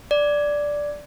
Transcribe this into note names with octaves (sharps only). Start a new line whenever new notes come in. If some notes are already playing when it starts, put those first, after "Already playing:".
D5